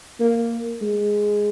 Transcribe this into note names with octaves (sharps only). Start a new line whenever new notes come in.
A#3
G#3